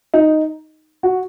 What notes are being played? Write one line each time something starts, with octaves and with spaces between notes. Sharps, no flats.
D#4
F#4